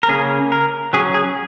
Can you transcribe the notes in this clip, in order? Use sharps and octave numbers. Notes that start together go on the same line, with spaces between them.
A#4
C#3 A#3 C#4 G#4
A#4
F#3 C#4 G#4
G#4